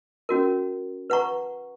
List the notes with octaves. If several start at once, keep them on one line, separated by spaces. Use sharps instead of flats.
C#4 F#4 A#4
B4 F#5 A#5 C#6